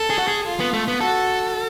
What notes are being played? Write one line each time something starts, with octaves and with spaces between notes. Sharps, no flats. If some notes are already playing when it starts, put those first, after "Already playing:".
Already playing: A4
G#4
F#4
G#4
F4
B3
A3
B3
F#4 A4